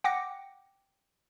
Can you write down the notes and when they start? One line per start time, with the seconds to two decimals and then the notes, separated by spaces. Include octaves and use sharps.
0.04 F#5 G5 D6 A#6 C#7